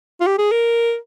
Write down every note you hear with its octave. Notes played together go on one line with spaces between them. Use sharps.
F4
G4
G#4
A#4